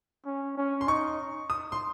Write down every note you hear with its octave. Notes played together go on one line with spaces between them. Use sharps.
C#4
C#4
C6
D#4 C#6
D#6
C6